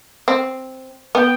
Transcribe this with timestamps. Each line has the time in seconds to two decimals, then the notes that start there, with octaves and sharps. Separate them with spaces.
0.28 C4
1.15 B3 G5